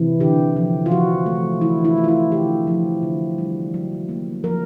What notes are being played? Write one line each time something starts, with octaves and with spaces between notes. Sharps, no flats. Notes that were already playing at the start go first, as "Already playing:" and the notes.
Already playing: C3 E3
D3 G4
F3
F4
F3 F#4
A3
E3 E4
E4
A3
F4
E4
D3 G4
F3
D3
G3
F#3
A#3
F3 A#4